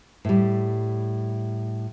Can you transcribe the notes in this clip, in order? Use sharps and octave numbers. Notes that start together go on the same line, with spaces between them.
A2 G3